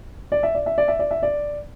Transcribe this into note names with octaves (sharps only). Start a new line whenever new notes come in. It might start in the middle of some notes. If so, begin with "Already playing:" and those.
D5
E5
D5
E5
D5
E5
D5
E5
D5